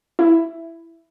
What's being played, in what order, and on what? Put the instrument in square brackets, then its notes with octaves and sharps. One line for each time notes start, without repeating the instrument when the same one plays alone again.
[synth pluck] E4